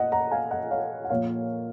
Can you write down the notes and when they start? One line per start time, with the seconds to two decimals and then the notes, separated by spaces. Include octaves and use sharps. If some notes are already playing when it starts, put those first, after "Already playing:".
Already playing: A#2 D#5 F#5
0.12 F#5 A#5
0.31 F5 G#5
0.51 D#5 F#5
0.71 C#5 F5
1.04 F#5
1.10 A#2 F3 A#3 C#5 F5